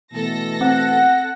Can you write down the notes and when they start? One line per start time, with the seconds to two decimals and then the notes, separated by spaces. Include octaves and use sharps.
0.13 B2 E3 A3 A4 A#6
0.61 C4 F#5